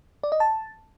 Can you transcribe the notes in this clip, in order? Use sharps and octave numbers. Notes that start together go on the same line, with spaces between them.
D5
D#5
A5